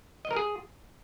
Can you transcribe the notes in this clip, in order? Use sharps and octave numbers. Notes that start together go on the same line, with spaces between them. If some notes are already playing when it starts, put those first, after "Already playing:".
D#5
A#4
G#4